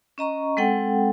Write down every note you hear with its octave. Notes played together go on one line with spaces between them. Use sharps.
C#4 D#5 A#5 C#6
G#3 C4 A4 F#5 G5